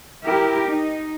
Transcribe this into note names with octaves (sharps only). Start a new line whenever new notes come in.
E4 G4 A#4
D#4